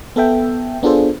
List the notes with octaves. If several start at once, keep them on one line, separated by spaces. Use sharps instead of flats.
B3 A4 E5 G5
B3 D4 F4 G#4 A4 C5